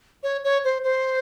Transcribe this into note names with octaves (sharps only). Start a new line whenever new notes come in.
C#5
C#5
C5
C5